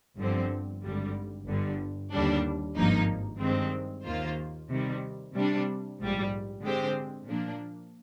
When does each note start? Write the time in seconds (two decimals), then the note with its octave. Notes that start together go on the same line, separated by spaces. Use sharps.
0.18 G1 G2 D3 F3 C4
0.83 G#1 G2 D3 G3
1.47 G1 G2 D3 G3
2.12 D#2 D3 G3 D4
2.76 G#1 G2 F3 A#3 D#4
3.40 G2 D#3 G#3 C4
4.05 D#2 D#3 A#3 F4 C5
4.69 C3 D#3 G3
5.35 C3 G3 D4
5.99 A#1 G#2 G3
6.63 D3 G#3 C4 G4 C5
7.28 A#2 F3 A#3 D4